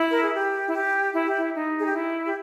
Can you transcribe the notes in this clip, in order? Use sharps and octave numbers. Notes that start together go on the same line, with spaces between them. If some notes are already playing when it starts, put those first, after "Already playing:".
Already playing: E4
A#4
G#4
G4
E4
G4
E4
G4
E4
D#4
G#4
G4
E4
G4